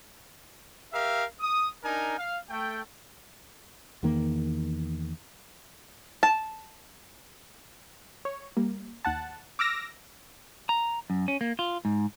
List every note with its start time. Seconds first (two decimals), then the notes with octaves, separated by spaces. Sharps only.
0.93 G4 A#4 E5 F5
1.40 D#6
1.84 D4 D#4 A#4 G#5
2.17 F5
2.50 A3 G5
4.03 E2 D#3 A#3
6.23 A5
8.25 C#5
8.57 G3 A#3
9.05 D#2 F#5 A5
9.59 D6 E6 F6 A#6
10.69 A#5
11.10 F#2
11.28 C#4
11.41 A#3
11.59 F4
11.85 G#2